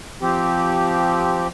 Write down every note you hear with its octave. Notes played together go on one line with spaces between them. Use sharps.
F3 C4 G4